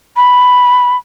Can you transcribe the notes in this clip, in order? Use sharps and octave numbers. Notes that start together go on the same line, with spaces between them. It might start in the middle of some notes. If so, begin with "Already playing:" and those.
B5